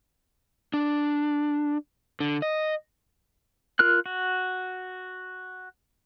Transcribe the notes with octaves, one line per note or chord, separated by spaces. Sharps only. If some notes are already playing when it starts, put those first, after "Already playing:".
D4
D3
D#5
F4 A#4 F6 F#6
F#4